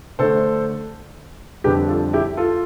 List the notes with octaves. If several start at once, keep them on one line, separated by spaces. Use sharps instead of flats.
D3 A3 D4 A4 C5
F2 D3 G3 D4 G4 B4
F4 A4
E4 G4
F4 A4